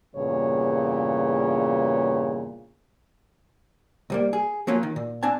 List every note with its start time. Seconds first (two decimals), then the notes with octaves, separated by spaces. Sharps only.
0.16 E2 G2 A#2 C#3 C#5
4.10 C2 G3 A#3
4.33 G#4
4.67 F3 F#3 A#3 C#4 F4
4.83 D#3
4.96 A#2
5.23 C4 D4 G#5 A5